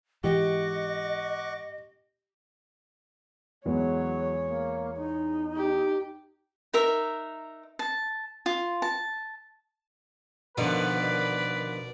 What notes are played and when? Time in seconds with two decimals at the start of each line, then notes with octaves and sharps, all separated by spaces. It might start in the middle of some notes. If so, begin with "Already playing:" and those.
0.24 G#2 E3 G4 D#5 F#5 C#6 D6
3.65 E2 F#3 G#3 B3 C#5
4.47 A#3
4.97 D#4
5.56 G4
6.73 D#4 A#4 E5
7.79 A5
8.46 F4
8.82 A5
10.58 B2 D3 D#3 F3 A#4 B4 D5